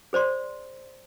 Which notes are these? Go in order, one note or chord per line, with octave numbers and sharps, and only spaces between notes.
G#4 C5 D5 C6